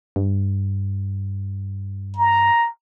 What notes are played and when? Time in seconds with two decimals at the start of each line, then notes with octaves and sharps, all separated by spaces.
0.16 G2
2.17 A#5